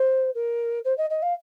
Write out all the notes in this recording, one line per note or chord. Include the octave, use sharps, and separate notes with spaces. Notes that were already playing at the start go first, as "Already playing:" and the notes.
Already playing: C5
A#4
C5
D#5
D#5
F5